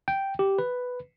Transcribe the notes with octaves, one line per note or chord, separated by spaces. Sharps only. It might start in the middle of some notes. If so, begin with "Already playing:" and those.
G5
G4
B4